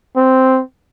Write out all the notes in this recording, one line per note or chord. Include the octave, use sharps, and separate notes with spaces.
C4